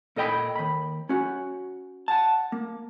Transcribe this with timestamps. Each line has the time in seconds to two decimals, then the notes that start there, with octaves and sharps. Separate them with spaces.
0.16 A#2 A4 D#5 G5 B5
0.56 D#2 B5
1.09 C#4 F#4
2.08 F#5 A5
2.52 A#3